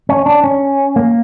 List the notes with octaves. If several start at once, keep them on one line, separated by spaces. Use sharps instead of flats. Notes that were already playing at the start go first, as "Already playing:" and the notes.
C#4
D4
C#4
A#3